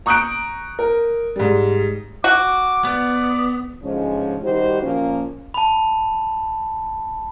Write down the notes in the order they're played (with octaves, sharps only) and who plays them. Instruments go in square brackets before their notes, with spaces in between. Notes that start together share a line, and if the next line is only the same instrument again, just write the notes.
[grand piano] A#5 C#6 D#6 F#6 G6 D7
A#4
G#2 G3
[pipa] F#4 [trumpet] D6
[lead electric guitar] B3 [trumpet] D5
[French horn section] D2 G#2 F3 G#3 C#4
D#3 G3 D#4 F#4 G4 C5
A#2 F3 A#3 C#4
[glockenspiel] A5 B5